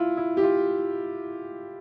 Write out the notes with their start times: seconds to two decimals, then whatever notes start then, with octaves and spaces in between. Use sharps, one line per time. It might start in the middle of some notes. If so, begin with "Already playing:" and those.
Already playing: E4 F4
0.17 E4
0.37 G4
0.43 F4